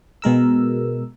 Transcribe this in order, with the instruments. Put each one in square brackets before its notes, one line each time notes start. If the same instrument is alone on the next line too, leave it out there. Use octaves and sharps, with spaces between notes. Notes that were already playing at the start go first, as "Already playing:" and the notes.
[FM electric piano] B2 G#3 A#4 E6